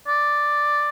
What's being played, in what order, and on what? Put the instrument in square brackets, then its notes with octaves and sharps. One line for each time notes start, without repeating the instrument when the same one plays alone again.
[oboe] D5